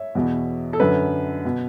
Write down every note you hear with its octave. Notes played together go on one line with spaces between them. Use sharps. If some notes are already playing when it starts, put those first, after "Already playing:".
Already playing: C#5 E5
E2 B2
A4
F#2 D3 B4
B2